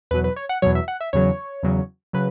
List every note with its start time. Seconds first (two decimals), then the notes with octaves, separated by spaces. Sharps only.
0.11 E2 B2 F#3 B4
0.24 B4
0.36 C#5
0.49 F#5
0.62 E2 B2 F#3 C#5
0.75 E5
0.88 F#5
1.01 E5
1.13 E2 C#3 F#3 C#5
1.63 E2 C#3 F#3
2.13 C#3 F#3 B4